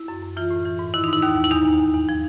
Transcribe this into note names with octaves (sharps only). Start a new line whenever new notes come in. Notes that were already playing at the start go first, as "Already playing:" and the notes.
Already playing: E4
F#2
F#2
E3 F4
A2
E3
G#2
D#3 E4
D#4
G#2
E4
D#2 D#4
D#2
E4
E2 D#4
E2
E2
E2
F3